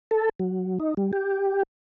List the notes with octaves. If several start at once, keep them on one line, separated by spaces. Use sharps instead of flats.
A4
F#3
D#4
G3
G4